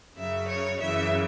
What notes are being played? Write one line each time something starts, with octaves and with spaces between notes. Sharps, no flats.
F#2 C#3 F#3 E5
C#5
F#2 C#3 E3 E5